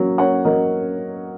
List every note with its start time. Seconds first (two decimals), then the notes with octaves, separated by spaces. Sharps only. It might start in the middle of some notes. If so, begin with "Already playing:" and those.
Already playing: F#3 A#3 C#4
0.18 A#3 C#4 C#5 F#5
0.44 F#3 A#4 D#5